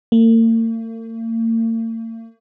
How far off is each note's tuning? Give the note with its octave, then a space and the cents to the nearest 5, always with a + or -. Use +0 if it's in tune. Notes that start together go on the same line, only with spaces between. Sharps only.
A#3 -45